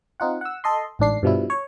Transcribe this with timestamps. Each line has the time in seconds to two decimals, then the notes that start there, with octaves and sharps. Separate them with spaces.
0.20 C4 D#4 F4 F#5
0.41 F#5 E6
0.64 A4 D#5 C6
0.99 A1 G#2 D4 C7
1.23 G2 B2 F3 G3 E4
1.50 C#5